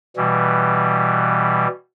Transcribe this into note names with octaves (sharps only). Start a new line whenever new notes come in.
B2 E3 G3